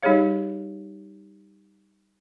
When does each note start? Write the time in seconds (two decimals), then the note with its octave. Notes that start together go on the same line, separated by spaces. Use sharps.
0.03 G3 D#4 G4 G#4 C#5 F5